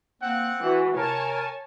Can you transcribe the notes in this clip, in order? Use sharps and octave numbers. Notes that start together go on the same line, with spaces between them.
A#3 C4 F#5
E3 F#4
C3 A#4 C#5 G#5 A5